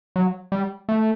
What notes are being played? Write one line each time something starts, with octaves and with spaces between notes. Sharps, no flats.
F#3
G3
A3